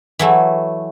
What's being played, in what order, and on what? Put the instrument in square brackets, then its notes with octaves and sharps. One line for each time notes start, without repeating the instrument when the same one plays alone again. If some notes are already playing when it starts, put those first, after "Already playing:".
[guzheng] E3 F#3 A3